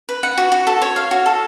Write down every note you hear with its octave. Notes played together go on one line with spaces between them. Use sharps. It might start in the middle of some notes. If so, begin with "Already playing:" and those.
B4
F#5
F#4
F#4
A4
C#5
F5
F#4
A4